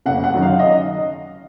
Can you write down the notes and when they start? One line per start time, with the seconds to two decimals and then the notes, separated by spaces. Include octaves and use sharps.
0.06 F#1 F#5
0.24 F#5
0.33 F#2 D#3 F#3
0.42 F5
0.59 D#5